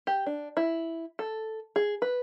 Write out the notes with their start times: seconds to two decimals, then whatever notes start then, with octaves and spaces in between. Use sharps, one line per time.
0.07 G4
0.26 D4
0.57 E4
1.19 A4
1.76 G#4
2.02 B4